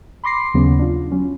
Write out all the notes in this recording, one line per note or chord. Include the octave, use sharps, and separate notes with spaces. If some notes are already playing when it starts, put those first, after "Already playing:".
B5 C6 D6 A#6 C7
D#2 C#3 F#3 B3 C#4
D4 F4
F#3 C#4